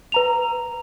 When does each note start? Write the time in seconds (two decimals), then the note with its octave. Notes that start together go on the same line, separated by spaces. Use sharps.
0.12 B4 A#5 F7